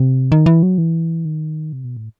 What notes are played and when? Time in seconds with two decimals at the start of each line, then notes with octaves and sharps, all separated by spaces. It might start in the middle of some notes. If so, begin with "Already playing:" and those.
Already playing: C3
0.32 D#3
0.46 E3
0.63 F#3
0.78 E3
1.25 D#3
1.73 C3
1.84 B2
1.97 A2